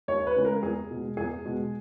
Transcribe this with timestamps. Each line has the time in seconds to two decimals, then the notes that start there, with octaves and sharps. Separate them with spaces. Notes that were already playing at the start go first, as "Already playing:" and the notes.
0.08 D#2 C#5
0.27 B4
0.36 C#3 G#3
0.45 A#4
0.63 E2 G#4
0.90 B2 G#3
1.17 E2 G#4
1.46 B2 G#3